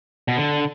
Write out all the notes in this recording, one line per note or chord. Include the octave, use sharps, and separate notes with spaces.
B2
D3